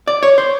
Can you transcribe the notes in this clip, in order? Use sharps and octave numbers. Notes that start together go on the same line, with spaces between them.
D5
C#5
C5